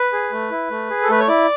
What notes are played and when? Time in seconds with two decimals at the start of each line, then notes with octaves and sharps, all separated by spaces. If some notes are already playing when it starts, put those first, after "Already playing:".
Already playing: B4
0.13 G#4
0.32 A3
0.51 E4
0.70 A3
0.90 G#4
1.03 A4
1.09 A3 B4
1.19 C#5
1.28 E4 D5